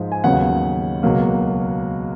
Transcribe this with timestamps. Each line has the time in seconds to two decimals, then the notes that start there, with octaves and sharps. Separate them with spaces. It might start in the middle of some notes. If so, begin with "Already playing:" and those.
Already playing: G#2 F3
0.12 G#5
0.24 D#2 C#3 F#3 B3 F#5
1.03 C#2 B2 F#3 A#3